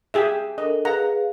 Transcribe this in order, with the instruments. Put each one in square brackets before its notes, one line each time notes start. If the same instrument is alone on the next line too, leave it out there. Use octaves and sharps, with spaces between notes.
[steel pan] G4 G#4 E5
[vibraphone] D4 A4 A#4 [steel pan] D#5
[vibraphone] G#4 B4 F5 [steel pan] F#5 A#5